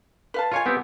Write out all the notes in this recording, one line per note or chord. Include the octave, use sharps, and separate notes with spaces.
B4 F5 A5
F4 C#5 D#5 F5 G#5
B3 C4 G4